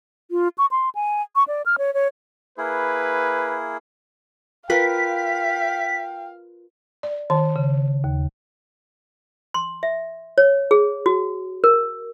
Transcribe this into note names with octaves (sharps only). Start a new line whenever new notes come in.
F4
C#6
C6
G#5
C#6
D5
F6
C#5
C#5
A#3 E4 G#4 B4
F4 A#4 B4 F5 G5 B6
D5
D#3 A5
C#3
D#2
C6
E5
C#5
G#4
F#4
A#4